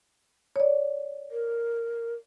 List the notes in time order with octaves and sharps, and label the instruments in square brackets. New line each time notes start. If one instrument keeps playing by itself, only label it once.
[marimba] C#5 D5
[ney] A#4